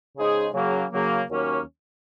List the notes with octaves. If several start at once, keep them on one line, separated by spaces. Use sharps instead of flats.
C#3 G#3 D#4 G#4 C5
C#3 F#3 A#3
C#3 F#3 A#3
D#2 D#3 F#3 A#3 C#4